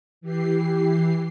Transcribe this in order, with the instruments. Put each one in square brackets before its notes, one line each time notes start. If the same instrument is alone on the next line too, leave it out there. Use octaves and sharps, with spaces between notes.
[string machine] E3 G4 C7